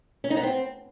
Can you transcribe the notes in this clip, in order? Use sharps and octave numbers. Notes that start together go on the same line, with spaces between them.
C#4
D#4
B3
C4